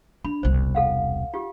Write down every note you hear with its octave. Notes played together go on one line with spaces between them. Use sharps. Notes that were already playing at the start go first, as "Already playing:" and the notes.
D4 B5
E1 C2 C5
A4 F5 F#5
F4 G4